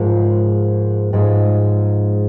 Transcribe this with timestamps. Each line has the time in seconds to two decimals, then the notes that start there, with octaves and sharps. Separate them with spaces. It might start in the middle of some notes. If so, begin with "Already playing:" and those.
Already playing: G#2 F3 G#3 F4 A#4
1.13 G#2 F3 G#3